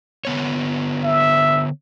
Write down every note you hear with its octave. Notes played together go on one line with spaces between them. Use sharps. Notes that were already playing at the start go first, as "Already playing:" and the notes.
D3 B3 C#5
E5